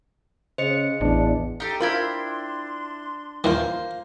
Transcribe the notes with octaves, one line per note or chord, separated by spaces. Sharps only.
C#3 C5 D#5 C#7
A1 E2 D4
D#4 G4 A4
D4 E4 F4 A#4 G5 B5 C6
D#2 E3 A#3 F4 C5